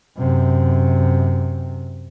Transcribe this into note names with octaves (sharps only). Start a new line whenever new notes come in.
F#2 C3